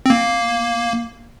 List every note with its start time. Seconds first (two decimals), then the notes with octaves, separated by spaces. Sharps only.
0.06 C4
0.10 A#3